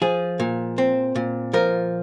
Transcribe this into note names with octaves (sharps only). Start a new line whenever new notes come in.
F3 G#4
A#2
C4
A#2
F3 A#4